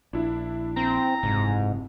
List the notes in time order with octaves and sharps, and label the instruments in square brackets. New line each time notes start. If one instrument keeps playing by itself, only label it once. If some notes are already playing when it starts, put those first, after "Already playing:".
[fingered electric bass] A#1 [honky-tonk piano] D4 E4
[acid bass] C4 [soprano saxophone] A#5
[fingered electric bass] F#1 C3 [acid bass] G#2